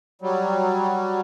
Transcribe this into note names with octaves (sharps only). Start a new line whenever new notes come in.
F#3 G3